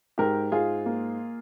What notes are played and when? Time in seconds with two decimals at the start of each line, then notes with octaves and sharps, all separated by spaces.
0.18 G#2 G4 A#4
0.52 G#2 F4 G#4
0.86 A#3